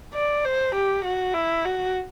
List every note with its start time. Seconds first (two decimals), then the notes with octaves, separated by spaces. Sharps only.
0.14 D5
0.45 C5
0.75 G4
1.05 F#4
1.34 E4
1.65 F#4